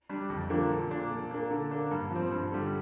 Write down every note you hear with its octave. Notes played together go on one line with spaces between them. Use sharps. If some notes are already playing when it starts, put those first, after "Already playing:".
G3 D4
F2
D3 F3 A#3 D4
A#2
A#3 D4
A#2
A#3 D4
D3
A#3 D4
G2
F3 C4
G2
D3 G3